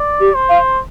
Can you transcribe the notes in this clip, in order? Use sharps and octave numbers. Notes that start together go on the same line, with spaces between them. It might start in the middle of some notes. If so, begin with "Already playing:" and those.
Already playing: D5
G4
C5
F5